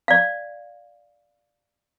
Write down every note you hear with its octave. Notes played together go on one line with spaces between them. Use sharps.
D5 F5